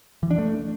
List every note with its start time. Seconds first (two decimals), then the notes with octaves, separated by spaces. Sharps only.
0.23 E3
0.31 D4
0.38 A3